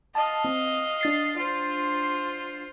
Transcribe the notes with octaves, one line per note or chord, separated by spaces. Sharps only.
D#5 F5 A5
C4
D4 A6 C7
F4 C5